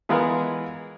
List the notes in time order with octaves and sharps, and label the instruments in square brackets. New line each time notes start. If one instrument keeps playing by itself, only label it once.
[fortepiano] E3 G#3 B3 F4 G#4 A#4